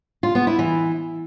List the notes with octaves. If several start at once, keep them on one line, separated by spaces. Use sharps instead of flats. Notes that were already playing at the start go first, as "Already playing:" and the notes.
F4
B3
E4
E3